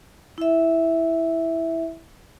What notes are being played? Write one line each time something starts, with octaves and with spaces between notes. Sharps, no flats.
E4 E5